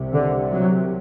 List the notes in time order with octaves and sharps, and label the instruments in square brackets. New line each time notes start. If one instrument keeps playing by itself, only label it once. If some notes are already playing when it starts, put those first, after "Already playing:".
Already playing: [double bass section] C2 C3
D3
F#3